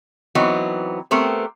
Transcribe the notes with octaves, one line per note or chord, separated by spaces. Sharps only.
E3 F#3 B3 C4 D#4
A3 B3 C4 G4 A#4